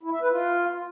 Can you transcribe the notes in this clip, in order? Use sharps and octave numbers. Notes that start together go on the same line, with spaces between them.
E4
E5
B4
F4